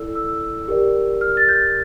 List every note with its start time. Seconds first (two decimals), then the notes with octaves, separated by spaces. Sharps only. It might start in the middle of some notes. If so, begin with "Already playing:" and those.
Already playing: E4 A4 D5 E6
0.15 E6
0.68 G4 A#4 D5
1.21 F6
1.37 A6
1.49 G6